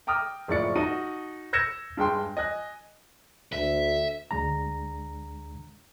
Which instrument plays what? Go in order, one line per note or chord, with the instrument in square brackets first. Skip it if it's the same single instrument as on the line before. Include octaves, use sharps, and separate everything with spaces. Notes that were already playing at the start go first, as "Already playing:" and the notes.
[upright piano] G5 A#5 D6 D#6 F6
F#1 A2 F3 D5 C#6 C#7
D#4 F#4 F#5 A5 D#7
E6 G6 G#6 A#6 C#7 E7
G2 G#3 G5 C6
D#5 G#5 F#6
[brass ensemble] D2 [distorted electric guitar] E5
[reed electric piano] D2 G#3 D4 A#5